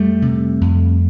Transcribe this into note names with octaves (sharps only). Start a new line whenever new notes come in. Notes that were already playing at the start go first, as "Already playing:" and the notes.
Already playing: F2 G3 A3
C3
F2